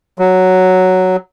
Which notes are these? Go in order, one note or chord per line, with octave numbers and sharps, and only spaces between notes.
F#3